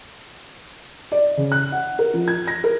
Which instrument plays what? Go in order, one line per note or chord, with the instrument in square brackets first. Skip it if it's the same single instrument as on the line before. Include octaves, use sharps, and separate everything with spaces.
[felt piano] D5
C#3
F#6
F#5
A#4
F3
G#6
A#6
A#4